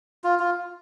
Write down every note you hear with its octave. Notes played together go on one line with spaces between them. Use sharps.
F4
F4